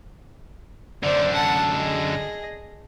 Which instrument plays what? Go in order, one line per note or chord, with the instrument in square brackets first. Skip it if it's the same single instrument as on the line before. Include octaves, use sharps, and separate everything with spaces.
[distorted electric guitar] F#2 D3 [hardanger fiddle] C5 D5
[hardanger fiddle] F#5 A5
G#4 D#5